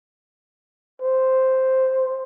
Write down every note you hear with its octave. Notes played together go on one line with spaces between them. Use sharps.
C5